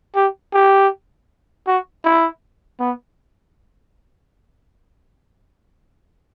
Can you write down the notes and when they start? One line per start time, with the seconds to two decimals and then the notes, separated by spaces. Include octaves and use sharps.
0.15 G4
0.53 G4
1.67 F#4
2.04 E4
2.80 B3